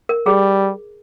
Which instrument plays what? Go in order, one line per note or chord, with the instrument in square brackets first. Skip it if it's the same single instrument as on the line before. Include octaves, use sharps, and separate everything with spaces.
[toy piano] A#4
[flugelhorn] G3 [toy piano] G#4